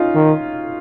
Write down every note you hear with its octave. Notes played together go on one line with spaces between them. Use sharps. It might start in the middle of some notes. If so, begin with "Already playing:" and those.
Already playing: C#4 D#4 F4
D#3